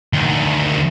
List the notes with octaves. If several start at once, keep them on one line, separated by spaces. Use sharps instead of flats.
D2 D#3